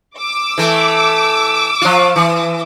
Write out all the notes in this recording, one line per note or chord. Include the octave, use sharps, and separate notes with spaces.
D6 E6
E3 A3
F3 F4
E3